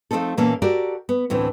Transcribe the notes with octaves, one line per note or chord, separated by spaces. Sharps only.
F3 A3 A#3 C4 D#4 A4
A#2 E3 A#3 B3 C#4 A4
F#4 G4 A4 A#4 D5
B3
D2 A2 E3 C4